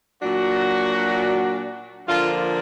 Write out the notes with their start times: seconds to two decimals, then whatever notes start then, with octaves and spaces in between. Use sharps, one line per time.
0.21 A#2 F#3 D4 F#4
2.07 D3 F3 A#3 F4